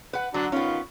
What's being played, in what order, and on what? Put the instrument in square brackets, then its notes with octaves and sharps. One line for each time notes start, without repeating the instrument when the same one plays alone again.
[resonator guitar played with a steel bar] B4 F#5
[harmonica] D3 D4 F#4 [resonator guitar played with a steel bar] F#3
[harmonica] D#3 F4 [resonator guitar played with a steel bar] B3 C#4